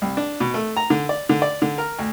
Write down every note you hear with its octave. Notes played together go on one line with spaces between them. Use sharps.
C2
D4
B2
A3
A#5
D3
D5
D3
D5
D3
A#4
D2